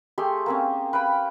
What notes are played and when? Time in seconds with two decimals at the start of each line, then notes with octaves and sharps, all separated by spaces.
0.18 A3 G4 G#4 C6
0.46 A#3 C4 C#4
0.93 B4 F5 G5 B5